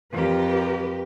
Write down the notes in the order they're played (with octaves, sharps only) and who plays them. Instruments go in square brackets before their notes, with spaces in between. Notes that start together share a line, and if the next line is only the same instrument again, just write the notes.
[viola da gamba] F2 [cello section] G4 A#4 B4